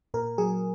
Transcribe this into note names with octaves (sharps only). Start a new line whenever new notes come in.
A#2 A#4
F#3 G#4